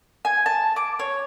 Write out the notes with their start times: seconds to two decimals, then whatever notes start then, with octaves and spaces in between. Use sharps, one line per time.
0.25 G#5
0.46 A5
0.76 D6
0.99 C#5